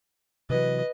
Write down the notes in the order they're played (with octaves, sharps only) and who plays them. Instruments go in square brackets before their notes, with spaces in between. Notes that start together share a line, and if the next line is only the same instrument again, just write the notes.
[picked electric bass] C3 E3 F#3 [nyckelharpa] B4 D#5